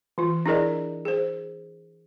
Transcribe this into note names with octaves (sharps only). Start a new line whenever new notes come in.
E3 F4
D4 E4 G#4 A#4 D5 D#5
G#4 C5